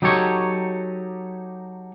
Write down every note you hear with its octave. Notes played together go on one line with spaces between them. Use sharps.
F#3 D#4 G4 A4 C#5